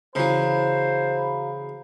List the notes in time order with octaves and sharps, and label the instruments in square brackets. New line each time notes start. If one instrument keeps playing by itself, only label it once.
[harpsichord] C#3 E3 [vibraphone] F#4 F5 A#5 [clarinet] C5 [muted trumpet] B5